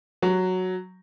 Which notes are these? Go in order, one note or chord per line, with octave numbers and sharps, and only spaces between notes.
F#3